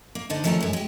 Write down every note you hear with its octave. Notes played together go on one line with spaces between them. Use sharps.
A#3
D3 D#4 C5
D#3 F3 A3 C#4 G5 A#5
F#2 G#3
G#3 G4